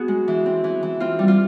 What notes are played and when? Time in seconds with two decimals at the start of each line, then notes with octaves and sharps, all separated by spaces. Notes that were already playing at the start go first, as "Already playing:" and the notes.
Already playing: B3 F#4 G#4
0.08 G#3
0.28 E3
0.46 C4
0.64 E3
0.83 E3
1.00 C4 F4
1.19 G3
1.28 F4